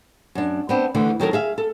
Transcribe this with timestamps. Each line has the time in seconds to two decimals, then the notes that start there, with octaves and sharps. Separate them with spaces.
0.35 F#2 D4
0.69 B3 C4 D4
0.94 D2 D3 E3
1.20 D#3 F#3 A4 A#4
1.33 G#4 E5 F5
1.58 A4